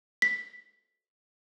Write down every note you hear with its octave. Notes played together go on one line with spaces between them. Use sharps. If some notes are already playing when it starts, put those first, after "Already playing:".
B6